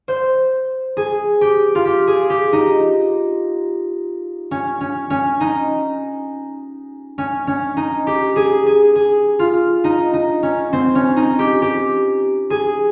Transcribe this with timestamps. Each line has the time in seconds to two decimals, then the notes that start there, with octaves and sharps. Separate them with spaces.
0.08 C5
0.97 G#4
1.41 G4
1.75 F4
1.85 G4
2.07 G#4
2.30 G4
2.53 D#4
4.51 C#4
4.81 C#4
5.10 C#4
5.40 D#4
7.18 C#4
7.47 C#4
7.77 D#4
8.07 G4
8.36 G#4
8.66 G#4
8.96 G#4
9.39 F4
9.84 D#4
10.13 D#4
10.43 C#4
10.73 C4
10.95 C#4
11.16 D#4
11.39 G4
11.62 G4
12.50 G#4